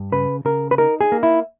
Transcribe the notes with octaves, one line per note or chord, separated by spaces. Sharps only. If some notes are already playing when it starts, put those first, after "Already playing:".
Already playing: G2
C#3 B4
C#3 A#4
B4
D#4 A#4
G#4
A#3
E4